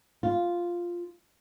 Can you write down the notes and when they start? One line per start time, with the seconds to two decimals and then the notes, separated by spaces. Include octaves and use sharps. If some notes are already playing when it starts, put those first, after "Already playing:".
0.23 F4